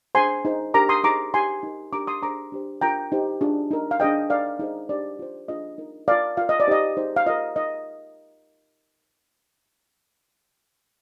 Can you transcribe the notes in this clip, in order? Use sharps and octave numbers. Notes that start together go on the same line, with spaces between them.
D4 G#4 C5 G#5 C6
D#4 G#4 C5
D4 G4 A#4 A#5 D6
C6 D#6
D#4 G#4 C5 A#5 D6
D#4 G4 C5 G#5 C6
D#4 A#4
D4 G4 A#4 A#5 D6
C6 D#6
D4 G#4 C5 A#5 D6
D4 G4 C5
D4 F4 A#4 G5 A#5
D#4 G4 C5
D4 F4 G#4
D#4 A#4
F5
D4 G#4 C5 D#5 G5
D#4 A#4 D5 F5
D#4 G#4 C5
D4 G4 C5 D5
F4 C5
D4 F4 G#4 D#5
D#4 A#4
F4 A#4 D5 F5
F4 A#4 F5
D#5
D5
D#4 G4 C5 D#5
D#4 G#4 C5
F5
F4 A#4 D#5
D#4 A#4 D#5